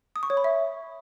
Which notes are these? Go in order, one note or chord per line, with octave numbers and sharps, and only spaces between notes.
D#6
C#6
C#5
B5
E5